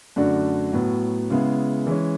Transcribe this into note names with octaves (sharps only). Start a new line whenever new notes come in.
F#2 D3 A3 D4 F#4
A2 F#3 B3
C#3 G#3 B3 E4
E3 G#3 C#4